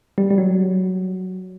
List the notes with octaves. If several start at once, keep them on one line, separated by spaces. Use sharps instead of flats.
G3
G3
F#3